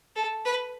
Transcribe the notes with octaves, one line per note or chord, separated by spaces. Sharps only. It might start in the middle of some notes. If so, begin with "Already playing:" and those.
A4
B4